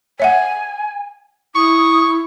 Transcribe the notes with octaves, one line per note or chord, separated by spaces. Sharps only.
C#5 E5 F#5 G#5
E4 C#6 D#6